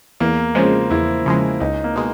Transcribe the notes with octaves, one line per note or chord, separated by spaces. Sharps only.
E2 A#3
C#3 F3 G#3 C4
E2 E4
C#3 F3 G#3
C#2 D#4
A#3
B2 G#3